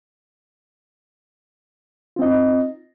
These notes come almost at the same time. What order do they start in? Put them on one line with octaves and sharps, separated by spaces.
F4 C4 D#5 D#4